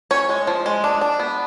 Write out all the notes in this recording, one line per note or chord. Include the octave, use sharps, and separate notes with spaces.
C#4 C#5
G#3
F3
G#3
D4
D4
B3